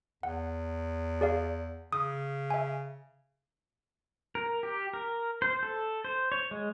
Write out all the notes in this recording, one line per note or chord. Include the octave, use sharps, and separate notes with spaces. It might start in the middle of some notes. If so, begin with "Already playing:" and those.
E2 F#5
G#4 D5 F5
C#3 D#6
E5 G#5
A#4
G4
A#4
C5
A4
C5
C#5
G#3